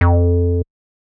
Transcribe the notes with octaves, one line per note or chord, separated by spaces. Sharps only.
F2